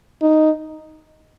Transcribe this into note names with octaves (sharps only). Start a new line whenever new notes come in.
D#4